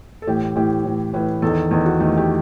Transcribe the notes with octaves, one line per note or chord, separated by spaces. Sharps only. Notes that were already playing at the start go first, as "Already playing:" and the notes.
A4
A2 E3 G4
A2 E3 G4
A2 E3
A2 E3 B4
E2 D#3 A4
E2 D#3 A4
F#4
E2 D#3 A3
G4